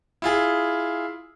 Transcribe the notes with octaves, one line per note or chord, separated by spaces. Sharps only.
E4 F4 G#4